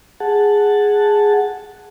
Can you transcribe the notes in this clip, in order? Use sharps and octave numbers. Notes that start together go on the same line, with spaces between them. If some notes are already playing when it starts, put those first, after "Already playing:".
G#4 F#5 A5